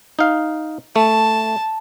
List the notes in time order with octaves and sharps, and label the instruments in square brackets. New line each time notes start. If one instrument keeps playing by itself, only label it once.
[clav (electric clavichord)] D#4 F5
[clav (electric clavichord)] A3 [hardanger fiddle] A5